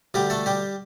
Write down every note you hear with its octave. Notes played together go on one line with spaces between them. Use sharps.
D2 D3 G3 G4
A3 A4
G3 G4